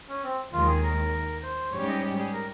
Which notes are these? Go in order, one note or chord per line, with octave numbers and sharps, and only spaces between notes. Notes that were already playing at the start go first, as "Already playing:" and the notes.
C#4
C4
D#2 D#3 G#3 F4
G#4
A#4
C5
G#2 G3 C#4 G4 C#5
D#5
G#4
A#4